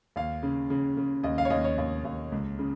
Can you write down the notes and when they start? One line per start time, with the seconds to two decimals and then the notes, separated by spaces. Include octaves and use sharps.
0.16 D#2 F5
0.43 C#3
0.70 C#3
0.97 C#3
1.23 D#2 D#5
1.38 F5
1.45 C#5
1.50 D#2 D#5
1.64 C#5
1.78 D#2
2.05 D#2
2.32 C#2
2.59 C#3